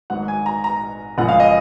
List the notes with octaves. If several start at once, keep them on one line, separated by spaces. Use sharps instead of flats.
G#1 G#2 F#3 F#5
G#5
A#5
A#5
F#1 F#2 F3 G#3 F#5
F5
D#5